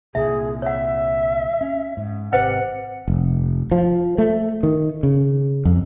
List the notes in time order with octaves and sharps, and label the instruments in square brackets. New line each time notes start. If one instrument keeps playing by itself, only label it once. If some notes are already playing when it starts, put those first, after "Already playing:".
[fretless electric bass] C2 A#2 D3 [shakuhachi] G#4 [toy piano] E5
[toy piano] C#5 F#5 [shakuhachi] E5
[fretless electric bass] C#4
G#2
[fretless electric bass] G#1 C3 [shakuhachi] G4 [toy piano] B4 C5 D#5 [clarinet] F#5
[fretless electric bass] F1
F3
A3
D#3
C#3
F2